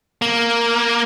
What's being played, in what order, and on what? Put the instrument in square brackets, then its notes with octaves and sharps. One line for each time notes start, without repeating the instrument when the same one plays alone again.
[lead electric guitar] A#3